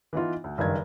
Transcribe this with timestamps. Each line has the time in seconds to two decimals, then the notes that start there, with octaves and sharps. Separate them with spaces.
0.13 E3 B3 D#4 F4
0.44 D2
0.58 F#1 G2 D#3 G#6